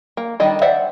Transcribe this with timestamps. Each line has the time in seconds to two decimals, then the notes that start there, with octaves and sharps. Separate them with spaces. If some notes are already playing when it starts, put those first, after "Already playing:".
0.17 A#3
0.40 D#3 G3 D4 D#5 B5
0.62 C5 D5 E5 F#5